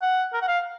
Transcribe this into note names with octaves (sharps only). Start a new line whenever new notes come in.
F#5
A#4
F#5
F5